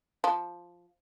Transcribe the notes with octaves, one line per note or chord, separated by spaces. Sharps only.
F3